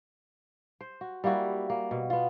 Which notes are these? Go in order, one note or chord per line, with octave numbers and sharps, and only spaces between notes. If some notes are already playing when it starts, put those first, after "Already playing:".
C5
F#4
G3 A#3 E4 F#4
A#3
B2
B3 F4